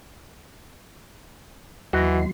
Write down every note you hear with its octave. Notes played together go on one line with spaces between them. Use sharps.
D#2 E3 F#3 F#4 D#5 C6